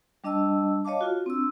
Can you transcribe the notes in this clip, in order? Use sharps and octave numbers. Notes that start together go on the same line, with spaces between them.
G3 D4 D#5 A5 E6
C#5 D#5 F5 A5 D6
F4 F#4
C4 D4 E6